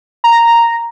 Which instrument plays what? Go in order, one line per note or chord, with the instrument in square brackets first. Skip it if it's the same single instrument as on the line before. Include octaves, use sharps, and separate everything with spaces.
[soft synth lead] A#5